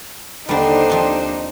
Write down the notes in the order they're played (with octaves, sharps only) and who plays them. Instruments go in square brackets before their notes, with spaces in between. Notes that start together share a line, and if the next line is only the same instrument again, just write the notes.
[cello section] D#2 D4 C5 [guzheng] D3 G3 [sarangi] D#4
[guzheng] F3 C4